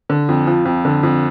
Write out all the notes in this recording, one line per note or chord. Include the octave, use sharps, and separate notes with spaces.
D3
F2
F3
F2
D3
F2